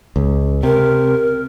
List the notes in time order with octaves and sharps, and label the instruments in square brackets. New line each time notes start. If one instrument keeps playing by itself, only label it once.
[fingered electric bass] C#2
[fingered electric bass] C3 [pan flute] A#4